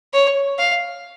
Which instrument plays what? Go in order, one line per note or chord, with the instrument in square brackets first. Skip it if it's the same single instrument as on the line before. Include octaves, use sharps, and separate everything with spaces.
[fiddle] C#5
F5